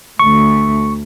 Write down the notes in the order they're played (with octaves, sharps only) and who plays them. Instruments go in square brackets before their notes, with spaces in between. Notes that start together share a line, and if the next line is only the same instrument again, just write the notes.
[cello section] D2 A3 [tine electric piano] C#6